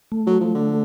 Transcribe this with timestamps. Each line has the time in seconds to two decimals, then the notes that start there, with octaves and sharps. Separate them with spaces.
0.12 A3
0.27 F#3
0.41 F3
0.55 D3